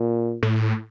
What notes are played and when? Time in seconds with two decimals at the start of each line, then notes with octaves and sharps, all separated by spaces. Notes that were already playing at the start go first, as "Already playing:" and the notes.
Already playing: A#2
0.43 A2